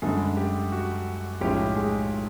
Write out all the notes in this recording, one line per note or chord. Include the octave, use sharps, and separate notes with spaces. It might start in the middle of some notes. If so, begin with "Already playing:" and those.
F#2 D3 G3 G#3 G#4
G4
F#4
B1 A2 F3 G#3 C#4 G4
G#3 G#4